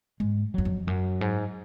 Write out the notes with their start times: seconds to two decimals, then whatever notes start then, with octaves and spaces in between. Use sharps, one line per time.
0.20 G#2 G#3
0.54 F#2 F#3
0.65 F2
0.87 F#2 F#3
1.21 G#2